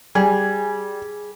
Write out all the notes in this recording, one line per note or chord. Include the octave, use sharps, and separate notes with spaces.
G3 G#4